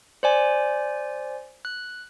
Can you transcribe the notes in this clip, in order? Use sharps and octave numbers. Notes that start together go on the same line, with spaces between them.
C5 D5 G#5
F#6